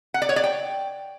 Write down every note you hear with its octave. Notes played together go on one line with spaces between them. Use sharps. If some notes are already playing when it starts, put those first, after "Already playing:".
F#5
D5
C#5
D5
G5